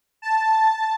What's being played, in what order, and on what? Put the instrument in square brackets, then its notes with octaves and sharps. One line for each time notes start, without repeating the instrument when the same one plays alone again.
[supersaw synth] A5